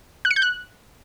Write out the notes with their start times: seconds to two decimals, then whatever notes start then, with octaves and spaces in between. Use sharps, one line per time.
0.25 F#6
0.31 C#7
0.36 G6
0.42 F#6